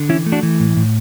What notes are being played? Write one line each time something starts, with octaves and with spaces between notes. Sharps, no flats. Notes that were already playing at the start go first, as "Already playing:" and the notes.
Already playing: D3
E3 C#4 E4
A3
D4 F#4
E3
A2
A2